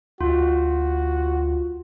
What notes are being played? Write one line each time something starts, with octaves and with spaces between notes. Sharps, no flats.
D2 F4 F#4